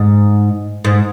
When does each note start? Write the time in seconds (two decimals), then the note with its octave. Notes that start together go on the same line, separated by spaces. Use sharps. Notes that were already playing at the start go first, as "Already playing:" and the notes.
Already playing: G#2
0.85 G#2